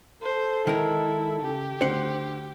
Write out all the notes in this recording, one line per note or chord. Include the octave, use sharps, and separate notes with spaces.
A4 C5
D#3 G#3 E4 A#4
C#3 G4
D2 D3 C5 F#5